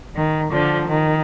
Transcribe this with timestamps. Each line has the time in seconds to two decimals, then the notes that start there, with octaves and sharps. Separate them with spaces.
0.15 D#3
0.51 D3 F3
0.87 D#3